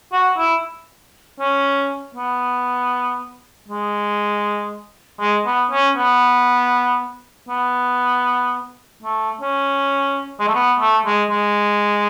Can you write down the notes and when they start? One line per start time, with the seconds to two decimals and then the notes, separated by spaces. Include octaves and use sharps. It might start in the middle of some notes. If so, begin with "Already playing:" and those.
0.12 F#4
0.38 E4
1.40 C#4
2.15 B3
3.68 G#3
5.20 G#3
5.46 B3
5.71 C#4
5.96 B3
7.49 B3
9.03 A3
9.41 C#4
10.40 G#3
10.48 A3
10.55 B3
10.80 A3
11.06 G#3
11.30 G#3